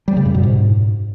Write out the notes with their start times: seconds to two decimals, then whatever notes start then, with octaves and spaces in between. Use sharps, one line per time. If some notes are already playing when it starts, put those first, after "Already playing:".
0.08 G3
0.17 C#3
0.25 F#2
0.34 B2
0.43 G#2